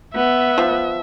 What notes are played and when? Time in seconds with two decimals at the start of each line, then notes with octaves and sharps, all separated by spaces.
0.15 B3 E5
0.58 F3